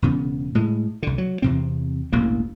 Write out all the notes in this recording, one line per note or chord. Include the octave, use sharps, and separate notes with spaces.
E1 C#3 B3
A2 G#3
C2 D3
F#3
E2 C3 C4
E1 A1 E2 A#3